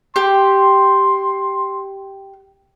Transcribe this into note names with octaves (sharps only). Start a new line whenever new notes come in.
G4 C6